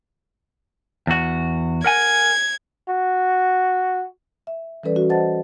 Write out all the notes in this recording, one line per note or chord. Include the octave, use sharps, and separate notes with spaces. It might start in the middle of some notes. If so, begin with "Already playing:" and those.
E2 F#4
A#4 F#5 G#5 G#6
F#4
E5
E3 G3 C#4 A4 B4 D5
C#4 F#4
C5 D#5 F#5 A5 A6